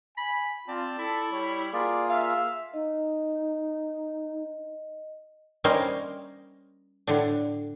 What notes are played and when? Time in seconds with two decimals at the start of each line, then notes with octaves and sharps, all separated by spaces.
0.18 G#5 B5
0.68 C4 F4 D5 A5
0.99 E4 A4
1.32 G3 C#5
1.73 A#3 F4 G#4 D5
2.10 E5 F5
2.74 D#4 D#5
5.64 G3 A#3 C#4 D#4 A#4 C5
7.07 A2 D3 D4